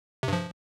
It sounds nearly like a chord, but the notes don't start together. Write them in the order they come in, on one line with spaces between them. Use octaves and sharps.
C3 G2 F3